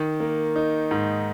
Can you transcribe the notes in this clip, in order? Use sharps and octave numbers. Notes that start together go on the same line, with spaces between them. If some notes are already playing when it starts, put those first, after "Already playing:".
Already playing: D#3
A#3
D#4
G#2